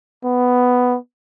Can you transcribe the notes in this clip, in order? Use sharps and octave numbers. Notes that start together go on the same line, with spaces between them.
B3